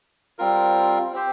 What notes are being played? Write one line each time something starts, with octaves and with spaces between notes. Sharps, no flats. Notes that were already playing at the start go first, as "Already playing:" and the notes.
G3 C4 F4 A#4
C4 G4 C5